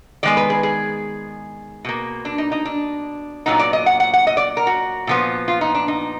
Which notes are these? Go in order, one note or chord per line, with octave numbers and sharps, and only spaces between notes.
D#3 G#3 B3 D5
B4
G#4
G#4
B2 A#3
D4
D#4
D#4
D4
A#2 F#3 B3 D#4
D5
D#5
F#5
F#5
F#5
D#5
D5
A#4
F#4
A#2 F3 B3
F4
D#4
D4
D#4